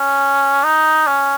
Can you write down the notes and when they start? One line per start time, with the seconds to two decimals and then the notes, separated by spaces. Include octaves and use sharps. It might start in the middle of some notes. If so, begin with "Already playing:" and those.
Already playing: C#4
0.64 D#4
1.07 C#4